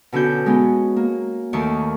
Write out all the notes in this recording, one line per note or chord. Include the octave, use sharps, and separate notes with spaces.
B2 D3 C#4 F#4 G6
G#3 B3 C#4
A#3
D#2 D#3 A3 C#6